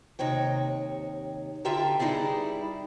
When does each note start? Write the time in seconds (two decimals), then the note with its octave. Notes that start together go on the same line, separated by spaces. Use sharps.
0.19 D#2 C3 D#4 C#5 G5
1.65 D3 F4 G4 E5 G5 A#5
1.99 G2 G3 D#4 E4 G#4 D5